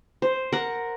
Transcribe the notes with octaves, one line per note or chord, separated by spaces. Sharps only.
C5
A#4 F#5